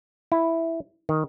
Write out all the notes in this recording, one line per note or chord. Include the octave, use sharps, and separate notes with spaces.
E4
D#3